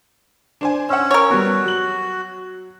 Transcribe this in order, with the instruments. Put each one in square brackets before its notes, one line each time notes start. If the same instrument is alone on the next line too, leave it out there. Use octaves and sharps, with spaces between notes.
[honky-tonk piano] D4 C5 G#5
[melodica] C#4 [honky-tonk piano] F#5 E6
[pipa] A#4 C#5
[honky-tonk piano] G3 B3 [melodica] F#4
[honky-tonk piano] F#3 F#7